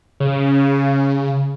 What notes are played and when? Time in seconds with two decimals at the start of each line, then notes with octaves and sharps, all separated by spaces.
0.20 C#3